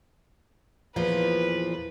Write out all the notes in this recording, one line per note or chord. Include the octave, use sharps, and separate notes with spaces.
E2 A#2 F3 B4